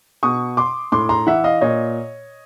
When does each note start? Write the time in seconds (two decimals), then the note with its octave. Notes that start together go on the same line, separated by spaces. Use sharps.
0.23 B2 C#6 D#6
0.57 C6 D6
0.92 A2 C6 D6
1.09 A#5 C6
1.27 E3 E5 F#5
1.44 D#5 F5
1.61 A#2 C#5 D#5